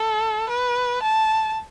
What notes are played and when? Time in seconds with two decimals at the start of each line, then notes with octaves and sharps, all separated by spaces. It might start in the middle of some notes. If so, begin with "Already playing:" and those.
Already playing: A4
0.49 B4
1.02 A5